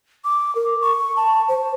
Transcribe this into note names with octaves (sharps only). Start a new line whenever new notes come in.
D6
A#4
C#6
A5
C5